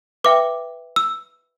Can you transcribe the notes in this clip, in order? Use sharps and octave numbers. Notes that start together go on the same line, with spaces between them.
B4 E5 G5 D6
E6